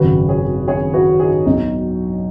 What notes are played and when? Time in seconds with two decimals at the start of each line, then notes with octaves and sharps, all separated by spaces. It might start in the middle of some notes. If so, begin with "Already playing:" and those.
Already playing: G#1 F#2 C#3 F#3 F#4 B4
0.29 G#4 C#5
0.68 G#4 C#5
0.94 F#4 B4
1.19 D#4 G#4
1.45 B1 B2 F#3 D#4